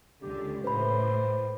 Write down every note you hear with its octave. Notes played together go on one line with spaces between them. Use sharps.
C#2 D3 G4
A2 B4 C5 B5